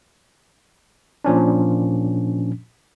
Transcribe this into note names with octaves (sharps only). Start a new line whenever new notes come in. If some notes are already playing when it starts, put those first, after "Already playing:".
A#2 F3 C#4 D4